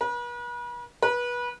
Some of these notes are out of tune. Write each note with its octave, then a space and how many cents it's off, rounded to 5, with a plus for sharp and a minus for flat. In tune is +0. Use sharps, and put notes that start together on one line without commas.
B4 -40
B4 -25